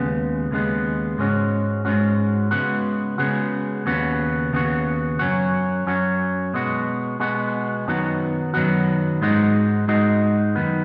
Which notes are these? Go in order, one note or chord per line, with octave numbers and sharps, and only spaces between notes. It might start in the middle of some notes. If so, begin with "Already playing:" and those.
Already playing: D#2 C#3 G#3 B3
D#2 C#3 G#3 B3
G#2 G#3 C#4 F#4
G#2 G#3 C#4 F#4
C#3 G#3 B3 F#4
C#3 G#3 B3 F#4
D#2 C#3 B3 F#4
D#2 C#3 B3 F#4
F#2 F#3 C#4 F#4
F#2 F#3 C#4 F#4
B2 G#3 B3 F#4
B2 G#3 B3 F#4
F#2 D#3 F#3 B3 F#4
F#2 D#3 F#3 B3 F#4
G#2 G#3 D#4 F#4
G#2 G#3 D#4 F#4
F#2 D#3 B3